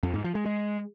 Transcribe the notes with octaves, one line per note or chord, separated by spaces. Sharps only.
F2
G#2
F3
G#3
G#3